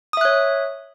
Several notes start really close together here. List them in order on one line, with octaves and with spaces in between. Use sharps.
D#6 E5 F#6 C#5